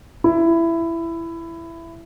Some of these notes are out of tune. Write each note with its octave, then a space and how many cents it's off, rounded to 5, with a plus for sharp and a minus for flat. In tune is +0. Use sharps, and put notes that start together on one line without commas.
E4 +15